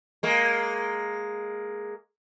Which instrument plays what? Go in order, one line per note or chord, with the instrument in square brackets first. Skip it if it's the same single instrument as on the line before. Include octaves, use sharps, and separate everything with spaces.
[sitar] G#3 A#3